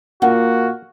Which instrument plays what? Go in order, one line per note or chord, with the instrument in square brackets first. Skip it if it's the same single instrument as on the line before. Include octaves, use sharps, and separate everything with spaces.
[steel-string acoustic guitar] A#2 [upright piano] A#3 [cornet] F#4 [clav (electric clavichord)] F#5